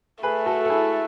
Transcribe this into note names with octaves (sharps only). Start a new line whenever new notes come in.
A3 G#4 B4
F#4 A4
A4
E4 G#4